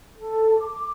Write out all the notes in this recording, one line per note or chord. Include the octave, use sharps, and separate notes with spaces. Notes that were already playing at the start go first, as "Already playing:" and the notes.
A4
D6